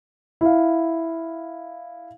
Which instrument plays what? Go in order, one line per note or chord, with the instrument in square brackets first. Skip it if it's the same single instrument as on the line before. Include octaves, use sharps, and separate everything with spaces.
[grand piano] E4 F5